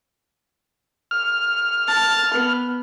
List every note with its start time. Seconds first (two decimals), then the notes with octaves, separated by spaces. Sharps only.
1.11 F6
1.88 A5
2.34 B3